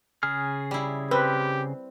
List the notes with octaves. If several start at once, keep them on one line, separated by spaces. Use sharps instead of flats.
C#3 G#4 F6
G3 E4
C4 G4 B4